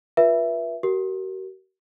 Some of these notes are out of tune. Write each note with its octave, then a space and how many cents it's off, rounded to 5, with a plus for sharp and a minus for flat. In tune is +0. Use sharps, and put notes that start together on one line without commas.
F4 +15 B4 -30 E5 +5
F#4 +45 A#4 +0